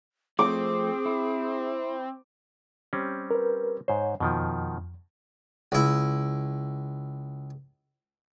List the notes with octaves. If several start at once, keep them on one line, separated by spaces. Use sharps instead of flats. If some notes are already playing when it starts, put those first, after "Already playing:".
F3 A3 C4 G#4 D6
E4
G3 C4 C#4
A#4 B4
G#2 C5 C#5
F2 B2 D#3 F3
C#2 E4